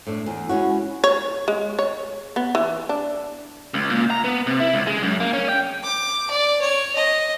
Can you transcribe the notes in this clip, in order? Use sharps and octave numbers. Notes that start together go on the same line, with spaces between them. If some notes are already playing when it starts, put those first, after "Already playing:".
A2 D4
E2
G#3 C#4 E4 F#4
C#5
G#3
C#5
B3
E3
D4
C#2
A#2
A#5
B3
C3
E4
C#2
G#3
F#2
A#3
C#4
G5
D6
D5
C#5
D#5